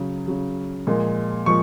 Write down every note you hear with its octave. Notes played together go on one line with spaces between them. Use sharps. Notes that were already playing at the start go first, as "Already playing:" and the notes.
Already playing: C#3 F#3
C#3 F#3
A#2 F3 G#3
A#2 F3 G#3 C#6